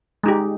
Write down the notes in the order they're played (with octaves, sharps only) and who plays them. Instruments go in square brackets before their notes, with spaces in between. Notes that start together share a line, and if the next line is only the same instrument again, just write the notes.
[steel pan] G#3 D#4 G4